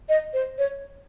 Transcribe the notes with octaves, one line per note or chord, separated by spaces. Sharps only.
D#5
C5
C#5